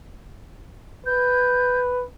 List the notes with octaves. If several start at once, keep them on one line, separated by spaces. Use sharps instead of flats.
B4 G6